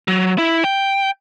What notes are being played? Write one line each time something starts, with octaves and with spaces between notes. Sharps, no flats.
F#3
E4
G5